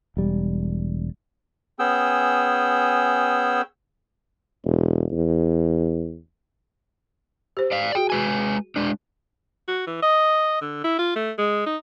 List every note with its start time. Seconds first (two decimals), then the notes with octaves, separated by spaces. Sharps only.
0.17 E1 G3
1.79 B3 C#4 G#4 G5 E6
4.65 E1
5.12 E2
7.57 G4 C5
7.72 D5 F5
7.95 F#4 G#4 G5
8.10 G#3 B4 G#5
8.76 G#3 D4
9.68 F#4
9.87 E3
10.02 D#5
10.61 D3
10.84 E4
10.99 F4
11.16 A3
11.38 G#3
11.66 D#4